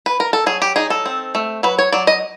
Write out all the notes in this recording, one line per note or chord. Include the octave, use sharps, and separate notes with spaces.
B4
A#4
A4
F#3 G#4
G4
D#4 G#4
A4
C4
A3
F#3 B4
C#5
F#3 D5
D#5